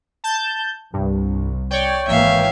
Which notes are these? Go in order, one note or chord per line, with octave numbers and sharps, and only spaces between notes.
A5 G6
C2 G2
C#5 D5 G5
G#1 E3 A#3 E5 F5